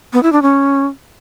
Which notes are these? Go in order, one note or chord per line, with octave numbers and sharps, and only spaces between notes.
B3
E4
D4
C#4